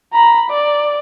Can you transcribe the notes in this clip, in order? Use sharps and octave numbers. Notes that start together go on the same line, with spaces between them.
A#5 B5
D5